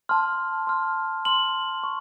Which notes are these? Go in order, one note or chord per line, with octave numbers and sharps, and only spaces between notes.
A5 C6 F6
C6 F6
C6 F6 F#7
C#6